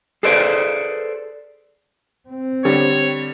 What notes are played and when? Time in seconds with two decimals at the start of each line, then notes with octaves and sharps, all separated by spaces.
0.23 G#4 A4 B4 C5 D5
2.29 C4
2.65 D3 G3 C#5